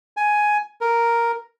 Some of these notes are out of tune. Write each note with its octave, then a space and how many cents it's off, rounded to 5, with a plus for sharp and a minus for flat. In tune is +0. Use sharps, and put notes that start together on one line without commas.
G#5 +10
A#4 +0